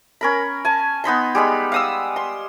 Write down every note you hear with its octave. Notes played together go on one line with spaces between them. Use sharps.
C#4 A#4 B5
G#5 A5
B3 D#4 B5 C6
G3 G#3 B5
F5 D#6 E6
C6